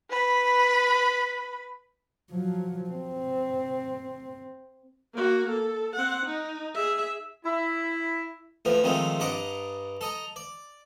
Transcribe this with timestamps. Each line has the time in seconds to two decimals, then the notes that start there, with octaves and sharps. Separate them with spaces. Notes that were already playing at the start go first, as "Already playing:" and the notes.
0.10 B4 B5
2.31 F3 F#3
2.90 C4
5.14 A#3 F#4
5.50 A4
5.95 C4 F#5
6.26 D#4
6.75 G#4 E5
7.45 E4
8.65 E2 A2 F3 B3
8.83 C3 D#3 F3 G#3 A3 C4
9.20 G2 D5 D#5 F#5 A#5 D6
10.01 A4 D#5 A#5
10.36 D5